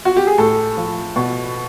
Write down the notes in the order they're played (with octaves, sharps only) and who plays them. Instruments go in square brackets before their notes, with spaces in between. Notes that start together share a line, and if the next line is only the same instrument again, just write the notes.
[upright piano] F#4
G4
G#4
A2 A4
F3
B2